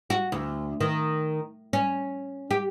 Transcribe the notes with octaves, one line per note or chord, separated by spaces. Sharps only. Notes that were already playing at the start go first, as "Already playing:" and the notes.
F#4
D2
D#3
C#4
G4